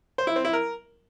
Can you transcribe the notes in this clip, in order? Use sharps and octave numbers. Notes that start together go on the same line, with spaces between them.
C5
E4
C4
E4
A#4